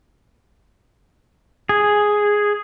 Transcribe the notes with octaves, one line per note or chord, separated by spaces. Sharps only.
G#4